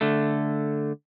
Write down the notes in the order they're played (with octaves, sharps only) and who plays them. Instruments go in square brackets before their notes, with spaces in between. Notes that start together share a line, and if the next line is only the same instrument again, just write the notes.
[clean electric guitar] D3 A3